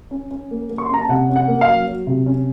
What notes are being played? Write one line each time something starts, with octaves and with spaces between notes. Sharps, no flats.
C#4
C#4
A#3
A#3
C#6
C6
C#4 A#5
A5
C3 F#5
C#4
F#5
A#3
F5
F#3
F#3
C3
C#4